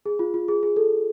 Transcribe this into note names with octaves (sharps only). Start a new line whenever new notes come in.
G#4
F4
F4
G#4
G#4
A4